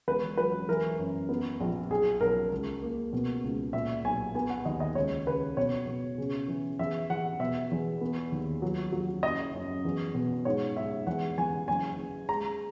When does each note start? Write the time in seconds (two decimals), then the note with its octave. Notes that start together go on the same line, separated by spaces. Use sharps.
0.08 E1 B4
0.37 F#3 B4
0.69 E3 A#4
0.99 F#2
1.29 B3
1.61 A#1
1.90 B1 G#4
2.21 B1 A#4
2.51 C#2
2.82 A#3
3.13 B2
3.44 C#2
3.73 A#2 E5
4.04 B1 G#5
4.35 B3 G#5
4.50 F#5
4.65 D#2 D#5
4.80 D#5
4.95 C#2 C#5
5.26 C#3 B4
5.57 B2 C#5
5.87 B2
6.18 C#3
6.48 E3
6.79 E2 E5
7.10 E2 F#5
7.40 B2 E5
7.71 E2
8.01 B3
8.32 D#2
8.62 F#3
8.92 F#3
9.23 F#1 D#5
9.54 F#2
9.85 E2
10.15 B2
10.45 G#2 C#5
10.76 G#2 E5
11.07 E2 F#5
11.38 E2 G#5
11.68 F#1 G#5
11.98 F#1
12.29 G#3 A#5